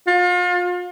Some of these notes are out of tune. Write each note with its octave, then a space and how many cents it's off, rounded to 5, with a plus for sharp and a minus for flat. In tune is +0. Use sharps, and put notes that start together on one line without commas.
F4 +35